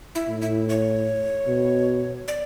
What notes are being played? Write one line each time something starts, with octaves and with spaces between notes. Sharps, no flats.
E4
A2
E4
C#5
B2
D5